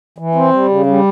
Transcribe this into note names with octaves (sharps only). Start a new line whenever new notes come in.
E3
C4
G3
C#3
G3